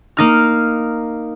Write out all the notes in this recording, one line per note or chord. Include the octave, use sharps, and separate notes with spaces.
A#3 D#4 F6